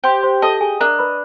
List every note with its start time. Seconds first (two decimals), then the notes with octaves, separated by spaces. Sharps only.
0.04 G4 C5 C6
0.23 C5 C6
0.42 A4 D#5 A5
0.61 G#4 G#5
0.80 D4 A#4 A#5
0.99 B4 B5